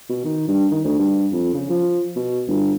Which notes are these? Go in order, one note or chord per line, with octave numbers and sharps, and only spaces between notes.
B2
D#3
G2
D#3
D2
G2
F2
C#3
F3
B2
G1